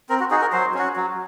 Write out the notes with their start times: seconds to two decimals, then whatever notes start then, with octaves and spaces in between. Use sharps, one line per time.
0.09 C4 A#4
0.20 F#4
0.31 D#4 F#4 G#4
0.41 A#4
0.53 F#3 C5
0.74 C#4 F#4
0.96 F#3